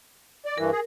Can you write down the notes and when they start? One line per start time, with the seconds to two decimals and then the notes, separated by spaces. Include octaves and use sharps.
0.45 D5
0.58 G2 E3 A#4
0.72 G#4